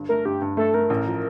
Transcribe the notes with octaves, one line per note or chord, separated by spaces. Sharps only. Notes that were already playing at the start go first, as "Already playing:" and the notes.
Already playing: G1 G2
A3 A#4
G2 G4
G2
A3 A4
A3 A#4
A1
F3